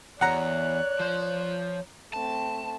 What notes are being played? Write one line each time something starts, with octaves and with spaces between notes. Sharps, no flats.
E2 C#5 D5 F#5 A#5 F#6
F3 C5
A3 C4 A5